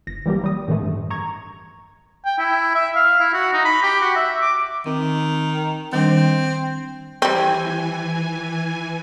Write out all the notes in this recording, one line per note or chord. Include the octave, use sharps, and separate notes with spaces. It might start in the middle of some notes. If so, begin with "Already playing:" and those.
G1 A#6
E3 G3 A#3 G4
G3 D#6
A2 D#3 E3 G#3 A3
G2
A#5 C#6 G#6
G5
E4
E5
F5
E4
F#4
D#4
B5
G4
F#4
E5
D6
D#3 C4
D#3 G3 C4 D4
E3 G3 C4 G#5